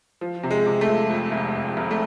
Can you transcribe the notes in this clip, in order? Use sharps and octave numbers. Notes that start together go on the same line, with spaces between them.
F3
C3
G#3
C3
A3
F3
F2
F1
F2
F1
A3